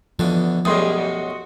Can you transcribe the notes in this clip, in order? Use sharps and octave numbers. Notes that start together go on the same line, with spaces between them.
E2 B2 D3 F3
B1 F#2 A2 G3 G#4 D#5 C6 D#6
F#4